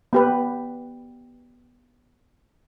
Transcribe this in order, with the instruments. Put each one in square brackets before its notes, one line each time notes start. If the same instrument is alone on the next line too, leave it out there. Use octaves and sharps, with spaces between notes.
[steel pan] B3 G4 B4